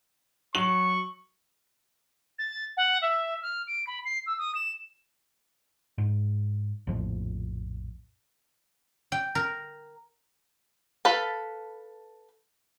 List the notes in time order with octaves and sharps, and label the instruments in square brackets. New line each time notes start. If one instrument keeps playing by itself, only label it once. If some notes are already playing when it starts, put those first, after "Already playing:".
[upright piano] F#3 F#7 [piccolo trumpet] C#6
[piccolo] A6
F#5
E5
F6
D7
B5
C7
E6
D#6
E7
[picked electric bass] G#2
A#1 F2 A2 F3
[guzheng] G5
A#4
[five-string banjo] A4 B4 F5 A5